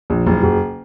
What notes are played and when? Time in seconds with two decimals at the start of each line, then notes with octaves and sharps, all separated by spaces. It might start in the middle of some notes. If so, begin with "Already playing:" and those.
0.10 A#1
0.26 F#1
0.43 F#1